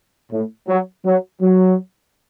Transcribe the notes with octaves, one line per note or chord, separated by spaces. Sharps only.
A2
F#3
F#3
F#3